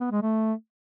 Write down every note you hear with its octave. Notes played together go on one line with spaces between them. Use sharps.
B3
G#3
A3